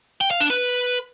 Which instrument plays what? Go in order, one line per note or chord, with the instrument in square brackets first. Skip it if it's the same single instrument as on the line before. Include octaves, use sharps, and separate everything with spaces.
[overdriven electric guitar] G5
F5
D4
B4